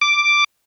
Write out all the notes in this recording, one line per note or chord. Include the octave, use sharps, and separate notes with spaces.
D6